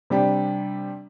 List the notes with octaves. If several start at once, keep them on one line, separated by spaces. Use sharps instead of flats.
C3 G3 D4 G4